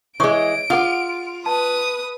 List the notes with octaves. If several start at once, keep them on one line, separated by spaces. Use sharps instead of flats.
E3 G#3 C#5 C#6 D#6 D7
F4 G#4 F#5 D#6
B4 A5 D#6